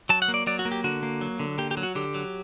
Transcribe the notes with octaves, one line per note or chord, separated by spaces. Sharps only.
F#3 A5
F#5
A#3
D5
F#3 D5
F#4
A#3
G4
D3 F#4
A#3
F#3
D3
A#3 G4
G4
F#3
F#4
D3 G4
F#3